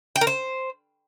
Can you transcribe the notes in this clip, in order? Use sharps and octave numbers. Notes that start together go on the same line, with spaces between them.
G5
A#4
C5